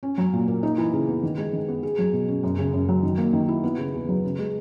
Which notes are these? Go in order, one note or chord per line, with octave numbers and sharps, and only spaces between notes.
C#4
F#3
A#2
A#3
D#4
E3
C#3
B3
D#3
G#3
D#3
B3
G#4
F#3
B2
C#4
F#2
C#3
F#2
F#3
D#3
A#3
D#3
E4
B3
C#3
E2
F#3
C#3
G#3